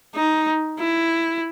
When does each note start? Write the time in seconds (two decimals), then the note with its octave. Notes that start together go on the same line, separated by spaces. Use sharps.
0.15 D#4
0.79 E4